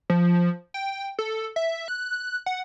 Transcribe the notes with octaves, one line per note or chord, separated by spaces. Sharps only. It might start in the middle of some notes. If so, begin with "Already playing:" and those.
F3
G5
A4
E5
F#6
F#5